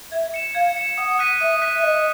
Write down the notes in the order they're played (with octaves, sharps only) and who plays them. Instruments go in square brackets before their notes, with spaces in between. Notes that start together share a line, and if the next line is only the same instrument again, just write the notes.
[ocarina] E5 [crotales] G#6
[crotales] C#7 E7
[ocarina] F5 [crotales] G#6
[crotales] C#7 E7
[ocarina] F#5 [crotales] D#6
[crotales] F#6 B6 D#7
[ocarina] E5 [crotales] D#6
[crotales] F#6 B6 D#7
[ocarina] E5
[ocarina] D#5 [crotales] F#6
[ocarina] D#5